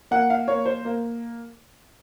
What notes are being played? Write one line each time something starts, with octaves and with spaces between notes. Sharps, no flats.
A#3 F#5
F5
A#3 C#5
C5
A#3